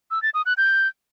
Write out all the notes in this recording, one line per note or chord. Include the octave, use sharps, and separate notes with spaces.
E6
A6
D#6
F#6
G6